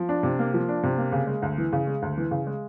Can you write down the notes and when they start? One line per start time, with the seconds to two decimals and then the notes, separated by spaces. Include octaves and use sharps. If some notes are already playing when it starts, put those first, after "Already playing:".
Already playing: F3
0.09 D4
0.23 C3
0.39 A#3
0.54 F3
0.69 D4
0.83 C3
0.98 A#3
1.12 C#3
1.27 G#3
1.42 D2
1.58 E3
1.73 C#3
1.87 G#3
2.02 D2
2.17 E3
2.31 C#3
2.47 G#3